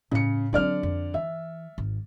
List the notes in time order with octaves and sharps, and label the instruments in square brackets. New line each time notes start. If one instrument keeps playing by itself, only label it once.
[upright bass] A2 [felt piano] C#3 C#7
[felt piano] D3 D5 F6 [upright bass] F#3 C4
[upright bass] F2
[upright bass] E3 [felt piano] E5
[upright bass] G#1